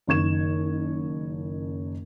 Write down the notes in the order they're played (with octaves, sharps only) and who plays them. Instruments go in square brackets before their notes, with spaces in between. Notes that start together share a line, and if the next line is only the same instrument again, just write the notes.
[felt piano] F#1 D#3 C#6 G#6 E7